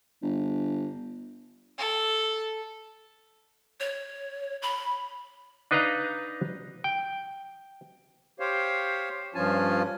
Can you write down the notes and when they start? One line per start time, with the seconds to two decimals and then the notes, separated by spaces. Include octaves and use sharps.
0.22 G1
1.79 A4
3.80 C#5
4.62 B5
5.71 D4 D#4 B4 D#5 F5 A#5
6.84 G5
8.40 G4 C5 C#5 F5
9.35 G2 F3 C#4 F4 G#5 A5